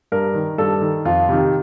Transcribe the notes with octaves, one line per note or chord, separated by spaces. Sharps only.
G2 A#4
D#3
G2 A4
D#3
F2 F4
C3 D#3